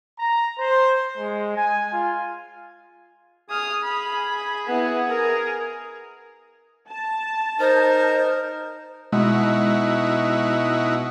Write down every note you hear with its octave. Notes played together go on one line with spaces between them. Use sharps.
A#5
C5
G#3
G#5
F4
G#4 D#6 F6
B5
B3 E4
A#4
A5
D#4 A#4 C5
B2 G#3 D#4 E4 F#4